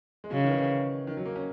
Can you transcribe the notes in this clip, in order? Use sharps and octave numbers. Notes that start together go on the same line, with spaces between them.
G#3
C#3 F#3
D#3
E3
D#3
F#3
A#3
C#4